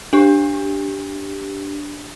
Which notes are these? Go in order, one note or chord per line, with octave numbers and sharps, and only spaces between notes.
D4 G4